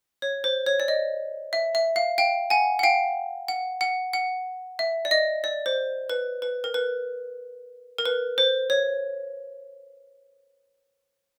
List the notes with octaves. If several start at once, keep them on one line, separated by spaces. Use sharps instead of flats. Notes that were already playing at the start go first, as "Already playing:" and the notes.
C#5
C5
C#5
D5
D#5
E5
E5
F5
F5 G5
F#5 G#5
F#5
F5 G5
F#5
F#5
F#5
E5
D5
D#5
D5
C5
B4
B4
A#4
B4
A#4
B4
C5
C#5